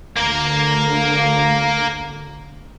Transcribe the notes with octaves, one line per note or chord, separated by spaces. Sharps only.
D2 D3 A#3 A#4